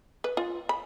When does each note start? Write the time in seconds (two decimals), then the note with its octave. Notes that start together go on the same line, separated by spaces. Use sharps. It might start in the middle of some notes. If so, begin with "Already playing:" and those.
0.24 B4
0.37 F4
0.69 B5